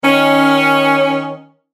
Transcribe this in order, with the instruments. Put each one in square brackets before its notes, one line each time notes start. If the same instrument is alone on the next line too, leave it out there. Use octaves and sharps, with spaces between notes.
[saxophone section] D#3 C#4